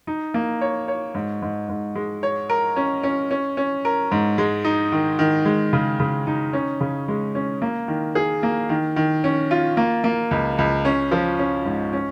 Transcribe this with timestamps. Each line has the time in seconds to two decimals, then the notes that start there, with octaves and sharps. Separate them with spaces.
0.07 D#4
0.34 A#3
0.61 C#5
0.88 C#5
1.15 G#2
1.42 G#2
1.69 G#2
1.95 G#3
2.23 C#5
2.49 A#4
2.76 C#4
3.03 C#4
3.31 C#4
3.57 C#4
3.85 A#4
4.11 G#2
4.38 G#3
4.64 D#4
4.92 D#3
5.19 D#3
5.45 G#3
5.73 C#3
6.00 C#3
6.27 D#4
6.53 C#4
6.81 C#3
7.08 G#3
7.35 C#4
7.62 A#3
7.88 D#3
8.15 G#4
8.43 A#3
8.69 D#3
8.96 D#3
9.24 C#4
9.51 F4
9.77 A#3
10.04 A#3
10.31 C#2
10.58 C#2
10.85 C#4
11.11 F3
11.39 C#4
11.65 G#2
11.93 C#4